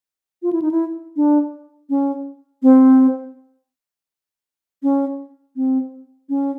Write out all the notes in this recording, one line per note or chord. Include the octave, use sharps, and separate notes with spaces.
F4
E4
D#4
E4
D4
C#4
C4
C#4
C4
C#4